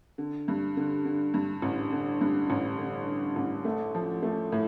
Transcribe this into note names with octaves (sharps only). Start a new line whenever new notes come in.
D3
G2
D3
D3
G2
A1
D3
G2
A1
D3
D3
A1
A3
F3
A3
A2